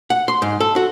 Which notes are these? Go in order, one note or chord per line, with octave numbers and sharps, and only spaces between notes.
F#5
C6
G#2
A4
F#4